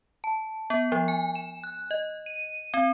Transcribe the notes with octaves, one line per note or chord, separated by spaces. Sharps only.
A5
B3
F3
G#5
E7
F#6
D#5
D#7
C4